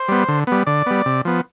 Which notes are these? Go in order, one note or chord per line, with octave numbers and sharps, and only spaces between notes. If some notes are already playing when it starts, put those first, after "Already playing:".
Already playing: C5
G3 B3
D3
G3 B3
D3 D5
G3 B3
C3
F3 B3